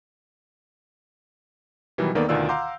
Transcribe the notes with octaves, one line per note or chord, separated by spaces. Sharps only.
B2 D#3 E3 F#3 G3
D#2 D#3 A#3 B3 A4 D5
D2 B2 D#3 F4 D5 E6
F5 F#5 A#5 C6 D6 G6